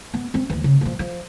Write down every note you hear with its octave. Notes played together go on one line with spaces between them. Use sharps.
B3
C4 C#4
D#2 E3
C#3
A#2 F3
F3